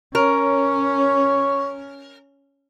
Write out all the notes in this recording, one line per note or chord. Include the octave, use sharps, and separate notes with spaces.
C#4 A#4 C#5